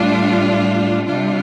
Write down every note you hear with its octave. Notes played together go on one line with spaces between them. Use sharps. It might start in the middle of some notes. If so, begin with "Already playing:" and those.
Already playing: A2 G3 D4 F4
C3 G3 D4 F4